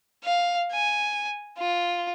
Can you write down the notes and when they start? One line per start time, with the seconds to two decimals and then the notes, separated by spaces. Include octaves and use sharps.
0.24 F5
0.72 G#5
1.58 F4